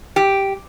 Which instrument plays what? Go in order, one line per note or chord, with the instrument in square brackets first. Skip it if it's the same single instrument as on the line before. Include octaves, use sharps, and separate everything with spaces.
[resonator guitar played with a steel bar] G4